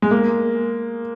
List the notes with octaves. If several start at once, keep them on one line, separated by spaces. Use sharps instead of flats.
G#3
A#3